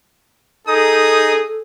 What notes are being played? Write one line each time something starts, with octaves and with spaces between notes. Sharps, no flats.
D#4 G#4 A4 D#6